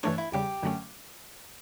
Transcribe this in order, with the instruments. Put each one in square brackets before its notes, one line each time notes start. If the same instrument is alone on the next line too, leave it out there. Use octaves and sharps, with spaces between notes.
[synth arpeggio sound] G2 E3 A3 D4 [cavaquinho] C#5
[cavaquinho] E4
[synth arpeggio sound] E2 C#3 G3 [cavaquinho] G4
[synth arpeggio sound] F#2 D3 F#3 A3 C#4